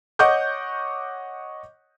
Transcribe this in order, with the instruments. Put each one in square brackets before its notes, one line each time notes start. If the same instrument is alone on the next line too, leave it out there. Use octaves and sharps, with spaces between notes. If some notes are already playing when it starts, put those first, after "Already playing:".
[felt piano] C#5 D#5 F#5 C#6 D6 G6